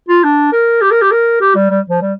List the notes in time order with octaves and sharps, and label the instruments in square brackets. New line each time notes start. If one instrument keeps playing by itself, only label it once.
[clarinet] F4
D4
A#4
G4
A#4
G4
A#4
G4
G3
G3
F3
G3